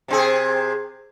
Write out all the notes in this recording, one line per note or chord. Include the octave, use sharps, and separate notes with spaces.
C3 C4 G#4